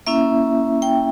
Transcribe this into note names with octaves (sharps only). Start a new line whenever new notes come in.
A#3 C#4 E4 E5
G5